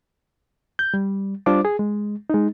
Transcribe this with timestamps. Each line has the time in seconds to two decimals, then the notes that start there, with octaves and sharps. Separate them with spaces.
0.79 G6
0.94 G3
1.46 G3 D4 F4 C5 D6
1.65 G#4
1.79 G#3
2.30 G#3 D#4